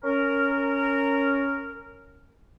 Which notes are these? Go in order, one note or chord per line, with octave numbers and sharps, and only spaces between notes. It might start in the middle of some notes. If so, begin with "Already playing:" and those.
C#4 A#4